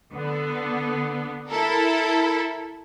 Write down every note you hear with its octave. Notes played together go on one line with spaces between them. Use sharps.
D3 B3
E4 A4 A#4